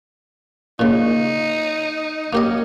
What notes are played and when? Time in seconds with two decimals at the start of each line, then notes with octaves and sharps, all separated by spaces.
0.79 A#2 C#3 D#4
2.33 A#3 C#4 G4 D#5